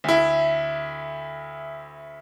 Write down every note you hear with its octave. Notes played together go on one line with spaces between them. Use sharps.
D2 E4